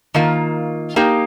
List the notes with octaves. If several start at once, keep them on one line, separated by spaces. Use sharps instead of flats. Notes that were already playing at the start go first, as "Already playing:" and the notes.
D#3 A#3 F4
A#3 D#4 G4